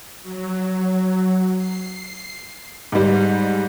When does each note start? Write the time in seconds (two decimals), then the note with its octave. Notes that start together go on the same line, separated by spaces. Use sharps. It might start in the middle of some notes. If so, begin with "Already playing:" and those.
0.22 F#3
1.55 C7
2.92 G#2 G3